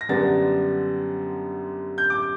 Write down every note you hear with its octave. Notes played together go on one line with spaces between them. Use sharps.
A#6
F#2 D3 G3 B3 D4 A6
G6
D6